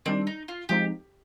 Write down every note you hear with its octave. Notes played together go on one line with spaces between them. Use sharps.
D#3 G3 C4 D4
D#4
F4
F3 G#3 C4 D#4 G4